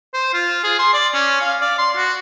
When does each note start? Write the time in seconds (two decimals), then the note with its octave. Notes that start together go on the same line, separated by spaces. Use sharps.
0.14 C5
0.34 F4
0.64 G#4
0.79 C6
0.94 D5
1.14 C#4
1.41 F5
1.61 D5
1.78 C6
1.96 F#4